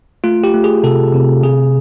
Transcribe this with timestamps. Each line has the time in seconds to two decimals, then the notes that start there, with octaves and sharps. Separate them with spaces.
0.24 A3 F4
0.44 G4
0.54 A3
0.64 G#4
0.83 C3 A4
1.14 C3
1.43 C3 G#4